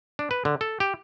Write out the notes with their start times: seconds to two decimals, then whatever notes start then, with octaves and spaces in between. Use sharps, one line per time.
0.19 D4
0.31 B4
0.45 D3
0.61 A4
0.80 G4